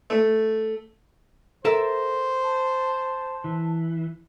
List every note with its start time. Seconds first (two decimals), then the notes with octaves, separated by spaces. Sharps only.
0.10 A3
1.65 A4 A#4 C5 E5
2.43 A5
3.44 E3